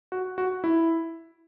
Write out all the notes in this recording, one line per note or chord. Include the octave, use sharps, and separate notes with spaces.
F#4
F#4
E4